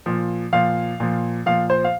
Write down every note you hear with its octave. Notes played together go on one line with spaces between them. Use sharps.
A#2 F3
A#2 F3 F5
A#2 F3
A#2 F3 F5
C5
F5